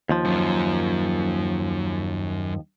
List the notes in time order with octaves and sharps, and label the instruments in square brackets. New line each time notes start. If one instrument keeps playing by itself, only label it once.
[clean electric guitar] D#2 F3
[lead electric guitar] F#2